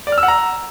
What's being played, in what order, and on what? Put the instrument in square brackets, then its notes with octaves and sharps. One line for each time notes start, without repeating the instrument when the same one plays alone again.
[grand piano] D5
F6
E6
F#5
A#5